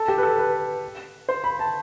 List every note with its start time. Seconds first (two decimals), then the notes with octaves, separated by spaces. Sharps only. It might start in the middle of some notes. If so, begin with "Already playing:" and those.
Already playing: A4
0.08 G4
0.18 B4
0.23 A4
0.38 B4
1.29 C5
1.44 B5
1.59 A5